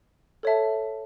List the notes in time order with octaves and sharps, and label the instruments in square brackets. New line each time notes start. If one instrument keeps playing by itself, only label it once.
[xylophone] A4 C#5 E5 A5